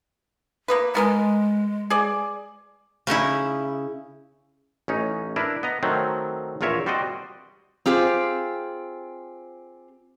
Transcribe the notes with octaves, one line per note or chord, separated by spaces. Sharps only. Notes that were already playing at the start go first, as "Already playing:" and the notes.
A#3 B3 B4
G#3 B3 A#4 G#5
G#4 D5
C#3 C#4 D#4 E4
A1 C#4 D#4
D4 E4 A#4 B4
B3 D#5 A#5
D#3 F#3 A3 C4
A#1 E2 F4 A#4 C#5 E5
G3 C4 F#4 C5 D5 D#5
C4 F4 G4 G#4 C5